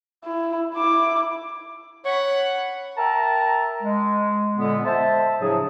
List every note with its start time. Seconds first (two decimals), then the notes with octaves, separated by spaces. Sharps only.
0.25 E4
0.75 E4 D6
2.05 C#5 F#5 B5
2.97 A#4 E5 G5 A5 A#5
3.83 G#3
4.58 A#2 D3 G#3 B3
4.85 C5 E5 A5
5.41 A2 C#3 F3 F#3 D4 G#4